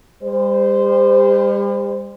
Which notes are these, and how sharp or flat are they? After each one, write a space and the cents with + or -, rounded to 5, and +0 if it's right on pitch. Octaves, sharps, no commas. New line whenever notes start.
G3 +40 C5 -15